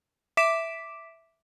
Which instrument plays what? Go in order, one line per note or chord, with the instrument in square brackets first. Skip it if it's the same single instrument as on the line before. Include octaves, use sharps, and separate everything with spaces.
[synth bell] E5 D6 B6 D7 E7